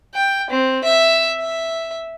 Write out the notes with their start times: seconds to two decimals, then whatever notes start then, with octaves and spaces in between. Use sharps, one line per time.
0.15 G5
0.50 C4
0.84 E5
1.40 E5